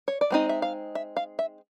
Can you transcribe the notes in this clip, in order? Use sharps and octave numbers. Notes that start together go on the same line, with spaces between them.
C#5
D5
G#3 C4 D#4 D#5
E5
F5
E5
F5
E5